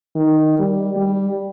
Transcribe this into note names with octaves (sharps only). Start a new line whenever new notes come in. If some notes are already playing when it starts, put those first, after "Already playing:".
D#3
G3
G3